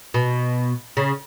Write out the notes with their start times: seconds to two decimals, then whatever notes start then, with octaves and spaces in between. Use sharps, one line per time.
0.14 B2
0.97 C#3